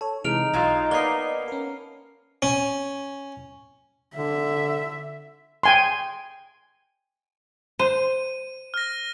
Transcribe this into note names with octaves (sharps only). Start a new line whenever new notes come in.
A4 C#5 A5
C3 E3 G#3 D#4 F6 D7 F7
B1 F#3 G#3 F4
A#3 B3 D5 D#5 C7 G7
C#4 A#4
C#4
D3 E5
G5 G#5 C6
C5 D#7
F6 A#6